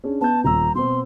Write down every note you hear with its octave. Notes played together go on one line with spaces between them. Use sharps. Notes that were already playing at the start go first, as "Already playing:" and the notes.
C#4 D4 G#4
B3 A5 G6
D#1 A#5 E6
B2 C4 C6